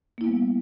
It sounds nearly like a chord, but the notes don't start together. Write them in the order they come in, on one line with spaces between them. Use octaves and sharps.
A#3 E4 B3 G3